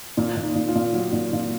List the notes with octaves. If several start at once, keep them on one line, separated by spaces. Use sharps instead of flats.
A#2 F4
A#2
D#4
A#2
F4
A#2
F#3
A#2
A#2